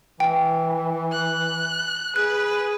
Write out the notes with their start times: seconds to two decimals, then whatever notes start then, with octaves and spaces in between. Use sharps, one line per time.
0.20 E3 G5
1.12 F#6
2.16 G#4 B4 F#6